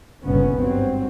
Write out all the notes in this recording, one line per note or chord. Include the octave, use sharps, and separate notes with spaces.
G1 D#2 A#2 C#3 B3 C#4
G#1 G2 F#3 C4